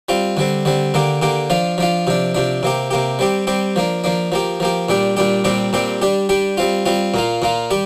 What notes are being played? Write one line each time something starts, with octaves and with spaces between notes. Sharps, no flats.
G3 C4 F4
D3 G3 C4
D3 G3 C4
D3 A#3 G4
D3 A#3 G4
F3 D4 F4
F3 D4 F4
C3 F3 D4
C3 F3 D4
C3 A#3 G4
C3 A#3 G4
G3 C4 G4
G3 C4 G4
F3 A#3 D4
F3 A#3 D4
F3 A#3 G4
F3 A#3 G4
A#2 G3 D4 G4
A#2 G3 D4 G4
A#2 G3 C4 G4
A#2 G3 C4 G4
G3 D4 G4
G3 D4 G4
G3 C4 F4
G3 C4 F4
A#2 A#3 F4
A#2 A#3 F4
G3 G4